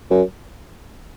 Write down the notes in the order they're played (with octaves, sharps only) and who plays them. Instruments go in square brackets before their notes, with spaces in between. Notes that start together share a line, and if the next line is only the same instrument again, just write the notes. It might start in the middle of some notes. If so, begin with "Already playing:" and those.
[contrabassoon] F#2